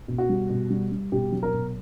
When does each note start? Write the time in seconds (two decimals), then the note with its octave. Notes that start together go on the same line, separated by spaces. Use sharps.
0.08 B2
0.18 F#4
0.29 G3
0.49 B2
0.70 G3
0.92 G3
1.12 B2 G4
1.32 F#3
1.43 A#4
1.53 B2